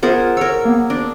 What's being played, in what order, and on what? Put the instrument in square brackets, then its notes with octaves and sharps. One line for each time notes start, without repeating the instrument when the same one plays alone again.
[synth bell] B3 F4 C5 [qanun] G#4 A#4 F#5
[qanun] A#4 C#5 [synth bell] E6
[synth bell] A#3 B3
[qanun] D4